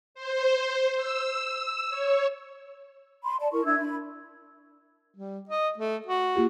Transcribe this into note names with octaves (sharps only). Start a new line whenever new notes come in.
C5
E6
C#5
B5 C6
D5 A5
E4 A#4 C#6
D4 E5 E6 G#6
D4 B5
G3
D#5
A3
F#4
A#3 F4 G4